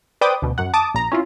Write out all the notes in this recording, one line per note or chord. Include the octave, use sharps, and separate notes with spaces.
B4 C5 D5 G5 D6 D#6
D2 B2
F#2 F#5
A5 D6 D#6
A#1 A#5
C#4 E4 F4